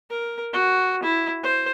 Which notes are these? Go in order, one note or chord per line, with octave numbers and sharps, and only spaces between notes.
A#4
F#4
E4
C5